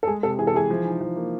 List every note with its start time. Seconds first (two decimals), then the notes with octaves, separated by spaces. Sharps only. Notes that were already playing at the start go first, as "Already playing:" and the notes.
0.03 A4
0.07 G#3 G#4
0.23 C3 A4
0.39 E3 G#4
0.47 A4
0.54 E3 G#4
0.70 F3
0.85 D#4
1.01 F3
1.16 A#3